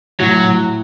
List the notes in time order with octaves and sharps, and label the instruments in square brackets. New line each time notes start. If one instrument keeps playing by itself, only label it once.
[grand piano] A2 [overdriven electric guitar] F#3
[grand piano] A2